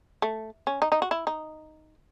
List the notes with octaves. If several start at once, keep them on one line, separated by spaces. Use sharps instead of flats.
A3
C#4
D#4
D#4
F#4
E4
D#4